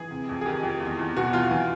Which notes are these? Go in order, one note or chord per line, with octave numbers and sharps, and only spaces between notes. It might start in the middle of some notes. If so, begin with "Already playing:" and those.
Already playing: E3 G#4
C3
F2
G#4
D#3 G4
F2
E2
E2
B2 F#4
E2 F4
E3